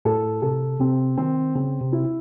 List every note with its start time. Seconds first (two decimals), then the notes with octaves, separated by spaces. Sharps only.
0.05 A2 A4
0.42 C3 A4
0.80 C3 C4
1.17 D#3 C4
1.55 C#3 C4
1.81 C3
1.93 E4